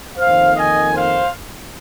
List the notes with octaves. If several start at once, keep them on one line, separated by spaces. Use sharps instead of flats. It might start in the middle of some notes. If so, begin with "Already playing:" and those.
F2 D#3 A#3 C5 F5
D#5 G#5
C5 F5